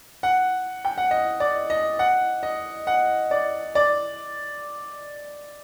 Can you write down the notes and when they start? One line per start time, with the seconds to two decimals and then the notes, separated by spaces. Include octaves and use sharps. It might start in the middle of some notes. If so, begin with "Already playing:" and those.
0.23 F#5
0.85 G5
0.98 F#5
1.11 D#5
1.40 D5
1.70 D#5
1.99 F#5
2.43 D#5
2.87 F#5
3.31 D5
3.75 D5